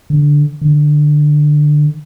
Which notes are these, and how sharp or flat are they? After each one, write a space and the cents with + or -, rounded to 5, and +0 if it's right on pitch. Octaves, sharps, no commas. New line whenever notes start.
D3 -5
D3 +15